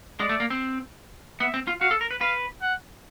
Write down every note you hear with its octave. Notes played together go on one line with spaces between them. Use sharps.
G#3 D5
A3
A#3
C4
B3 E5
C4
F4
F#4 F5
A4
A#4
B4
B4 F5
F#5